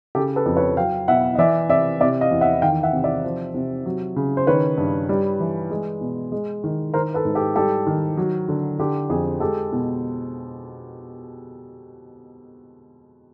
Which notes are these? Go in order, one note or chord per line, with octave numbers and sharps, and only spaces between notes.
C#3 G4 A4
A4 B4
F2
B4 C#5
F#3 F5 G5
B2 E5 F#5
D#5
E3 D5 E5
C3 D5 E5
C3 D5 E5
D#5 F5
E2
E5 F#5
D#3 F5 G5
E5 F#5
C3
D5 E5
F3
C3
F#3
C#3
C5
D#3 B4 C#5
G2
G3
E3
G#3
B2
G#3
D#3
D#3 A#4 C5
A4 B4
G#2
G4 A4
G3 G4 A4
D#3
F#3
D3
D3 G4
F2 G#4
G#3 G4 A4
B2